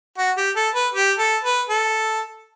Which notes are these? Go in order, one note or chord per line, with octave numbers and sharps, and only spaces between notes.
F#4
G4
A4
B4
G4
A4
B4
A4